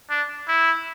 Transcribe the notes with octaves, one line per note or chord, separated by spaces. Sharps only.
D4
E4